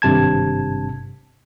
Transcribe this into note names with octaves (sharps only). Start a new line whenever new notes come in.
G#1 G2 C3 A5 G#6